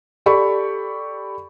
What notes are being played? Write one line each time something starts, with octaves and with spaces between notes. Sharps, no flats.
G4 A4 D5 B5 C#6